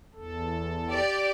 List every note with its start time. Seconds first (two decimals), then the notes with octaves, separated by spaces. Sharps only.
0.15 E2 A4
0.89 G4 D5